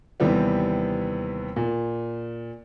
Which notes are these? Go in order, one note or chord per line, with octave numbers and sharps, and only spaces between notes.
D#2 C3 E3 G3 B3
A#2